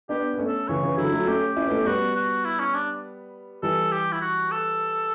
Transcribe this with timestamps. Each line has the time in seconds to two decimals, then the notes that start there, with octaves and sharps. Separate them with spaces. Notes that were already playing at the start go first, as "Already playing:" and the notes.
0.09 B3 D4 G4
0.34 B3
0.39 A3 C#4
0.48 A4
0.68 C#3 E3 C#5
0.83 C#3 E3
0.97 D3 F#3 E4
1.12 F#3 A3
1.27 A3 C#4 G4
1.56 C#4 E4
1.66 B3
1.71 A3 C#4
1.86 G3 B3 F#4
2.16 F#4
2.45 E4
2.60 C#4
2.74 D4
3.62 E3 G3 A4
3.92 G4
4.12 E4
4.21 F#4
4.51 A4